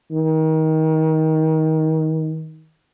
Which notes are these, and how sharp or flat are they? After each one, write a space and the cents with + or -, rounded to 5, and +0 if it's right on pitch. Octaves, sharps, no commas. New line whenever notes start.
D#3 +25